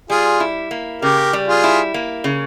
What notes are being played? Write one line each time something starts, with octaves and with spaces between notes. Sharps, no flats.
G3 F4 G#4
E4
A#3
C#3 G4 A#4
G3
F4 G#4
E4
A#3
C#3